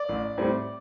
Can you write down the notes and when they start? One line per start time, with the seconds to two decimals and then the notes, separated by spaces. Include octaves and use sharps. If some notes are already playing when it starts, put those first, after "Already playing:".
Already playing: D5
0.09 A1
0.38 A2 G3 C4